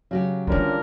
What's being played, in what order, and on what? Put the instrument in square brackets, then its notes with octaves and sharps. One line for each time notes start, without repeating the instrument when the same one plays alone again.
[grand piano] C#3 [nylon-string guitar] F#3 F#4 G4
[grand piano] D3 G3 C#4 [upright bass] E3 G#3 [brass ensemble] D4 F4 A#4